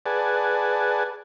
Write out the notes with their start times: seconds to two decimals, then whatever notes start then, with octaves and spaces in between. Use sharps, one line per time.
0.06 G#4 B4 D5 F#5 G#5 A5